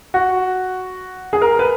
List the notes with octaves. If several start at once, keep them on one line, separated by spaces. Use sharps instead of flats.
F#4
G#4
A#4
B4